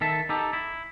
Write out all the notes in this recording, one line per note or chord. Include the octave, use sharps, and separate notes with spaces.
D#3 A4 E5
D#4 G4 A4
E4